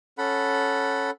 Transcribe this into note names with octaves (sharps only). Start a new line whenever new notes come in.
C#4 A4 F#5 B5